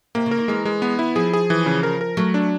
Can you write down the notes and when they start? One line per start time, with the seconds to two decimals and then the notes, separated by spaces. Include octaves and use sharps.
0.15 C3 A#3
0.26 C#3
0.31 A#4
0.37 D#3
0.48 E3 G#3
0.65 G#3
0.82 B3
0.99 E4
1.15 F3 G#4
1.33 G#4
1.50 E3
1.66 C#3
1.83 A#4
2.01 A#4
2.17 F#3 A3
2.34 D4